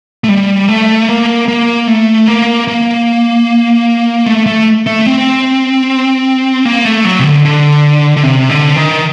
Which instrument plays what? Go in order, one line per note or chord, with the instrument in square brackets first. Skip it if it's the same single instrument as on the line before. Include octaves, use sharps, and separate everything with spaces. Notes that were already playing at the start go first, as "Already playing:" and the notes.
[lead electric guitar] A3
G3
A3
A#3
A#3
A3
A#3
A#3
A3
A3
A3
C4
A#3
A3
F#3
C3
D3
D3
D3
C3
D3
D#3